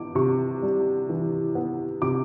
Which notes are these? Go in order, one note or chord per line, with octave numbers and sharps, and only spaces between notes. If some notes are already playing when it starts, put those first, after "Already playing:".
Already playing: E3 B3 D6
C3 C#6
G3
E3
B3
C3 D6